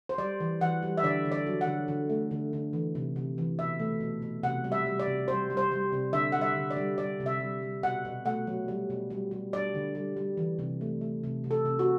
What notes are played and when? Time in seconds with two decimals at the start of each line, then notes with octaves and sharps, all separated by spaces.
0.09 C5
0.18 G3 D5
0.40 E3
0.61 E3 F#5
0.83 G3
0.98 E5
1.03 D3 D5
1.25 D3
1.32 D5
1.46 F#3
1.61 F#5
1.67 D3
1.88 D3
2.10 A3
2.31 D3
2.53 D3
2.73 E3
2.95 C3
3.16 C3
3.38 E3
3.59 B2 E5
3.80 A3
4.00 B2
4.22 B2
4.43 C3 F#5
4.64 G3
4.72 E5
4.86 G3
5.00 D5
5.08 C3
5.28 G3 C5
5.50 G3
5.57 C5
5.71 G3
5.92 C3
6.13 D3 E5
6.32 G3 F#5
6.41 E5
6.56 D3
6.71 D5
6.76 G3
6.98 G3 D5
7.20 C3
7.26 E5
7.40 G3
7.62 G3
7.83 B2 F#5
8.05 B2
8.25 A3 F#5
8.47 F#3
8.68 G3
8.90 B2
9.10 G3
9.31 G3
9.53 G3 D5
9.75 D3
9.95 G3
10.17 G3
10.37 E3
10.59 C3
10.81 A3
11.01 A3
11.24 C3
11.44 C3
11.51 A4
11.65 C3
11.79 F#4